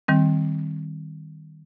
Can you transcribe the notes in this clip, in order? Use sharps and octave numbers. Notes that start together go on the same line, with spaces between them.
D#3 G3 C4